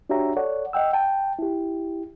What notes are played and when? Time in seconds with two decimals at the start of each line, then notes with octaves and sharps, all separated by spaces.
0.09 D4 F#4 G4 C#5 E5 A#5
0.36 A4 C#5 D5 F#5
0.73 D#5 F#5 G5 E6
0.93 G5 A5
1.39 E4 G4